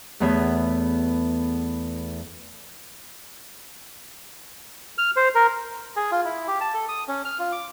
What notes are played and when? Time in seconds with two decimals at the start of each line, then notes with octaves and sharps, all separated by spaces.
0.20 E2 A3 B3 G#4 C#5 E5
4.98 F6
5.16 C5
5.35 A#4
5.96 G#4
6.12 F4
6.25 E4
6.47 G4
6.61 A5
6.74 A4
6.88 D#6
7.08 C#4
7.25 F6
7.39 F4
7.52 D6